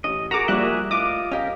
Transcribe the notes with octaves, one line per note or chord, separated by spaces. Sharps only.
A1 D#5
F#4 G#4 A#4 A#5 D6
F3 G3 A#3 F#4 G#4 E5 F#6
A2 F4 D#5 D6
C#4 G4 A#4 D#5 F5